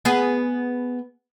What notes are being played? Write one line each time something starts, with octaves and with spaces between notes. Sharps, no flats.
B3 G#4